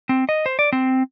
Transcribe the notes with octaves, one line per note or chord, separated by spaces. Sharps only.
C4
D#5
C5
D5
C4